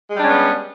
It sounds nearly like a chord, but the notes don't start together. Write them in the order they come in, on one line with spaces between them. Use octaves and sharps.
G#3 G3 D4 C#4 B3